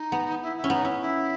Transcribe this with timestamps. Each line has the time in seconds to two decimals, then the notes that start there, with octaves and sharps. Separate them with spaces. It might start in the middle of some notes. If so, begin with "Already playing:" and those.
Already playing: D#4
0.12 B3
0.41 E4
0.56 E4
0.64 C#4
0.70 B3 D#4
0.85 C#4 E4
1.00 E4